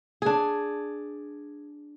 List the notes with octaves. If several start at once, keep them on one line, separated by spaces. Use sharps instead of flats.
D4 G#4